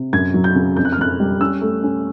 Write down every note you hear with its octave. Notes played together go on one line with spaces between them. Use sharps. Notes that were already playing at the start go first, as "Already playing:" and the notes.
Already playing: C3
F#2 G#6
F#3
G6
C#3
F2 G6
F#6
F6
F2 F#6
G3
C#4 E6
A3
C#4